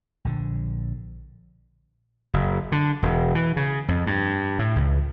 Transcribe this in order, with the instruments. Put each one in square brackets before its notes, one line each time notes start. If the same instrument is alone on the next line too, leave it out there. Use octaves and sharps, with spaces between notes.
[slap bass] A#1 D3
F#1
D3
E1
E3
C#3
F2
G2
A2
C#2